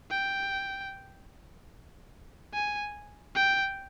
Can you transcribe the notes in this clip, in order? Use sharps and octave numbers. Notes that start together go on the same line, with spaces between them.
G5
G#5
G5